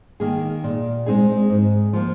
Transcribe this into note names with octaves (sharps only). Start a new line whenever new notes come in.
D#3 A#3 G#4
A#2
G#3 C4 D#4 G#4
G#2
F3 A#3